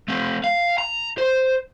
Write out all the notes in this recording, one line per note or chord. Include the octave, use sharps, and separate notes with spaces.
A3 C4
F5
A#5
C5